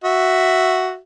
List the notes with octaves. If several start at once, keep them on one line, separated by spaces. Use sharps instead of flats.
F#4 E5